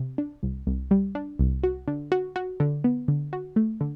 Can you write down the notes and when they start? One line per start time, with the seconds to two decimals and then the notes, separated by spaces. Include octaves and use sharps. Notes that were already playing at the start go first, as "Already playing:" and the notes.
Already playing: C3
0.18 D4
0.43 C2
0.67 C2
0.91 G3
1.15 D4
1.39 C2
1.63 F#4
1.88 D3
2.12 F#4
2.36 F#4
2.60 D3
2.84 B3
3.08 D3
3.33 F#4
3.56 A3
3.81 D3